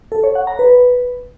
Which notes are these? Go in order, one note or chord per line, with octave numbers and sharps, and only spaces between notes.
A4
C#5
F#5
A#5
B4